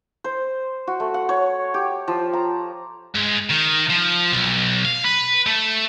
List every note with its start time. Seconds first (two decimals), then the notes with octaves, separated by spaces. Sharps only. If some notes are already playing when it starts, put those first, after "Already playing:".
0.24 C5
0.87 F#4
1.00 A3
1.14 F#5
1.29 C#5
1.74 G4
2.08 F3
2.33 A#5
3.15 G#2
3.50 D#3
3.90 F3
4.32 B1
4.85 F5
5.04 B4
5.47 A3